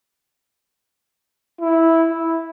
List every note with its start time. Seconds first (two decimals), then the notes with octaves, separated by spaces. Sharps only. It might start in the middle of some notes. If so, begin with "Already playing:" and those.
1.61 E4
2.10 E4